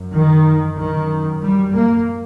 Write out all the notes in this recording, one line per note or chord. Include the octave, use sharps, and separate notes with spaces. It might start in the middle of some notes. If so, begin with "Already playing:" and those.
Already playing: F#2
D#3
F#2 D#3
G3
A#3